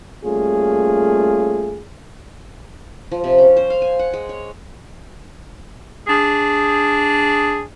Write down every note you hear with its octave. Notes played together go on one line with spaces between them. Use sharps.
G3 A3 A#3 C#4 F4 G#4
F3
C3
C#4
C5
F5
G#5
F#5
G#3
C#5
D4 G#4